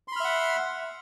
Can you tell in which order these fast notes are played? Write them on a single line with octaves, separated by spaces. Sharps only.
C6 B5 F6 E5 F#5